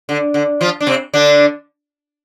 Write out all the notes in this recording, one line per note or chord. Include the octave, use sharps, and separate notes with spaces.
D3
D3
F3 F4
D4
C3 C4
D3 D4